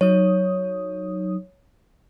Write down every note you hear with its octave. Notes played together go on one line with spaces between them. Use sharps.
F#3 D#4 C#5 D#6